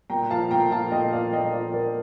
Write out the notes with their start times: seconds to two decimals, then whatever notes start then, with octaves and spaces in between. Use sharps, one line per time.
0.10 A#2 G5 A#5
0.31 F3 F5 A5
0.51 A#2 G5 A#5
0.71 F3 F5 A5
0.92 A#2 D#5 G5
1.13 F3 D5 F5
1.32 A#2 D#5 G5
1.53 F3 D5 F5
1.73 A#2 A#4 D5